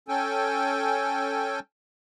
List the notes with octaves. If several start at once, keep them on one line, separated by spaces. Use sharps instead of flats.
C#4 A4 G5 G#5